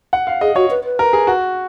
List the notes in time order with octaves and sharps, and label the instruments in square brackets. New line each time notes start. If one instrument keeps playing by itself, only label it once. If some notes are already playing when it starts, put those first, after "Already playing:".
[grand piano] F#5
F5
[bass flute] G#4 [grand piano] D#5
[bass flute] F#4 [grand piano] C#5
[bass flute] B4
B4
[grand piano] A#4
G#4
F#4